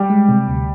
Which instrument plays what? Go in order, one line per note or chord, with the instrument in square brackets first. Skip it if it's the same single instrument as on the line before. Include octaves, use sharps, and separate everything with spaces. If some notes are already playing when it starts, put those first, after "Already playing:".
Already playing: [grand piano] G3 G4
[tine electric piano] G#3
C3
D2